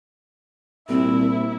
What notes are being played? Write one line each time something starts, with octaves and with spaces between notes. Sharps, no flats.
C2 A#2 C4 E4